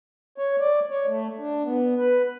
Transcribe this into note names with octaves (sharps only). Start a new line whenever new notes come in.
C#5
D5
C#5
A3
D4
B3
B4